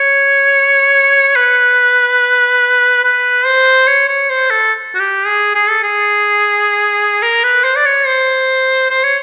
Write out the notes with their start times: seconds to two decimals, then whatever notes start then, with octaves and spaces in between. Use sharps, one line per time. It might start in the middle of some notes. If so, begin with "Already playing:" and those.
Already playing: C#5
1.36 B4
3.04 B4
3.46 C5
3.87 C#5
4.09 C#5
4.30 C5
4.50 A4
4.95 F#4
5.00 G4
5.27 G#4
5.55 G#4
5.69 A4
5.83 G#4
7.22 A#4
7.44 B4
7.64 C5
7.76 D5
7.85 C#5
8.07 C5
8.90 C5
9.04 C#5